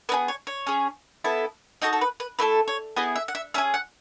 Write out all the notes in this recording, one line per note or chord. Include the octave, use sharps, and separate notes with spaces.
B3 D#4 G#4 B4
C#5
C#5
C#4 G#4
B3 E4 A4
D#4 F#4 A4 D#5
A4
B4
B4
A3 E4 A4 B4
C#5
B3 E4 G#4 D#5
E5
F#5
E5
C#4 G#4 E5
F#5